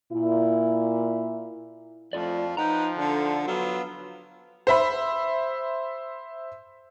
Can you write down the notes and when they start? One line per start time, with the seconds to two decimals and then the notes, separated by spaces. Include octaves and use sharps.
0.13 A#2 E4
2.13 F2 F3 A3 F4 D5
2.57 F3 D#4 B4 F#5 G5 A#5
2.97 D3 D4 A4
3.47 F#3 B3 F4 E6
4.67 C5 E5 B5